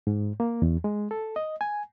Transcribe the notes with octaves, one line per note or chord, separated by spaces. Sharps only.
G#2
A#3
E2
G#3
A4
D#5
G#5